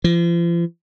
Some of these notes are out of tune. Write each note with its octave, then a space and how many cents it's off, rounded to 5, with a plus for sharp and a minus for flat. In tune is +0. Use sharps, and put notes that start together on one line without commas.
F3 -40